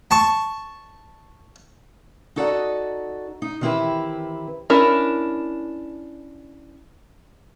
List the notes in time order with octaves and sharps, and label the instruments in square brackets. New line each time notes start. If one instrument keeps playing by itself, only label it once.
[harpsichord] A5 C#6
[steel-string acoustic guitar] D#4 F#4 A4 D5 D#5 F#5
D#4
D#3 E3 C4 E4 G4 B4
[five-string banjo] C#4 D4 E4 A#4